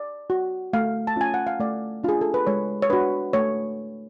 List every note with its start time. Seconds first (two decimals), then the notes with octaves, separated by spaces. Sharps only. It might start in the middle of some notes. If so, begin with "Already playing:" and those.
Already playing: D5
0.30 F#4
0.73 A3 F5
1.07 A5
1.16 C#4 F4 G#5
1.34 F#5
1.47 F5
1.60 A3 D5
2.04 D4 F4 G#4
2.21 A4
2.34 B4
2.47 G#3 C#5
2.82 C#5
2.90 D4 F#4 B4
3.33 A3 C#5